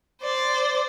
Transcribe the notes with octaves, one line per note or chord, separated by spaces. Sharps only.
C5 D5